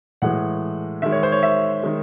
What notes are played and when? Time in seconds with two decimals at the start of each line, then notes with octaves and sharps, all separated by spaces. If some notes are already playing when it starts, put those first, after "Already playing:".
0.22 A2 E3 G#3 F#5
1.02 D#3 G#3 E5
1.12 C#5
1.23 C5
1.32 C#5
1.43 E5
1.83 D#3 G#3